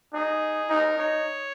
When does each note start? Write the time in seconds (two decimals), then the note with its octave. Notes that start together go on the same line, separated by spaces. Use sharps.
0.13 D#4 G#4
0.69 D#4 A#4
0.97 D#4 C#5